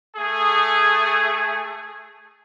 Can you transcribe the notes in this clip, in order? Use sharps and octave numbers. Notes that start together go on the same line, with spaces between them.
A3 G#4